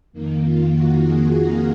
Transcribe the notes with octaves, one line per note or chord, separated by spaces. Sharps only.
F2 D#3 A#3
F4
F#4
G#4
A#4